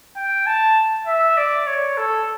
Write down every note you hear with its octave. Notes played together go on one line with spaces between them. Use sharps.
G5
A5
E5
D5
C#5
A4